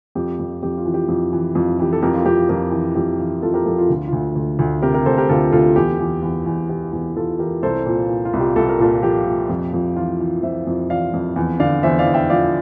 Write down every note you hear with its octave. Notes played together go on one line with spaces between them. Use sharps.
F2 G4
F2
F2 G4
F4
E3
G4
F2
E3
F2
E3 G4
A4
F2 G4 A#4
F4
F2 G4
F2 G4 A#4
E3
F2 G4
E3
F2 F4 A4
G4 A#4
F2 F4 A4
F4
D2 F4
D2 F4
D2
D2
C3 G4 A#4
G4 A#4
D2 A4 C5
G4 A#4
D2 F4 A4
D2 F4 A4
E2 G4
E2
E2
E2
E3 G4
E2
E2 F4 A4
E3 G4 A#4
C2 A4 C5
A#2
A#2
F4
C2
G4
C2 A4
A#4
A#2 F4 A4
F3 G4
A#2
F2
F2
E3 F4
E3
F2 C5 E5
F2
E3 D5 F5
F2
E2
D3 D5 F5
E2 C5 E5
D5 F5
E2
E5 G5
F3 D5 F5